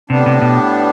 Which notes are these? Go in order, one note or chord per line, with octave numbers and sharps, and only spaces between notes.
A2 C3 G3 B3 D4
C3
B2